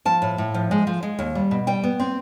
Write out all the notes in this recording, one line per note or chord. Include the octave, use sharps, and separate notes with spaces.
F3 A5
A2
A2
F3
G#3
F3
G#3
D#2
G3
B2
G3 G5
B3
C4